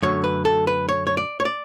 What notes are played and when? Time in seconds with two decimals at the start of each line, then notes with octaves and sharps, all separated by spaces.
0.03 F#2 D3 A3 C#5
0.24 B4
0.45 A4
0.67 B4
0.89 C#5
1.07 C#5
1.17 D5
1.40 C#5
1.45 D5